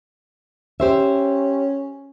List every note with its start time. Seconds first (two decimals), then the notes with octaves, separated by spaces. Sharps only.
0.80 C#4 G4 C5 E5